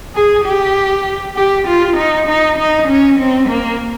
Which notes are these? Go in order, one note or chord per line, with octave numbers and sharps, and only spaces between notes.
G#4
G4
G4
F4
D#4
D#4
D#4
C#4
C4
A#3